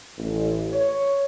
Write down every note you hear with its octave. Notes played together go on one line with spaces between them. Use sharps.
A1
C#5